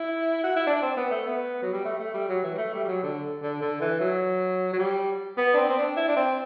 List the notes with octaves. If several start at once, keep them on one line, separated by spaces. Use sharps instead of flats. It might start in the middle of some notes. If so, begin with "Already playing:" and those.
Already playing: E4
F#4
E4
D4
C4
B3
A3
B3
F#3
G3
A3
A3
G3
F#3
E3
G3
A3
G3
G3
F#3
D3
D3
D3
E3
F#3
F#3
G3
B3
D4
C4
C4
D4
E4
D4
C4